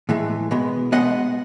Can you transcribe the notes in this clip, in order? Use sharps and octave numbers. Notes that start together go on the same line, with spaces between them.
A2 E3 G#3
B2 G#3 B3
B2 G#3 B3 D#5 F#5